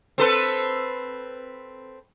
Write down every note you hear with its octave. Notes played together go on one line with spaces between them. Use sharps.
C4 A4 B4